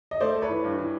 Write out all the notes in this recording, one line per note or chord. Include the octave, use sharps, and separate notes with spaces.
D#5
A3 C5 D5
A3
B4 C#5
E3
G2
E3